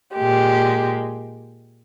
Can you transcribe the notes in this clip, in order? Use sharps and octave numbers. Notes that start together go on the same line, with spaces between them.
A#2 G#3 G4